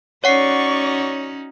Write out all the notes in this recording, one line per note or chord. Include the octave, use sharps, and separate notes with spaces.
C#4 D#4 F#4 C#5 D5 F#5 C#6 C7